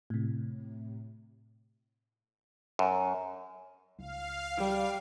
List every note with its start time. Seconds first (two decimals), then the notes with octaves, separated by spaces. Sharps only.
0.10 A2 C3
2.79 F#2
3.99 C#2 F5
4.57 G3